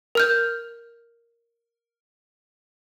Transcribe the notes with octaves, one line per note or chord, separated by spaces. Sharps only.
A#4 F6 G6